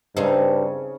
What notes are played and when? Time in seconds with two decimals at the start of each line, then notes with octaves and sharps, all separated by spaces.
0.17 G2 C#3 C4 D#4